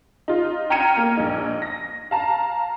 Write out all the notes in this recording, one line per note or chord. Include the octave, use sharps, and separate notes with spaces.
D#4 F4
G5 A#5 F6 G#6 C#7 D#7
A#3
A#1 D#4
A#6
F5 A5 A#5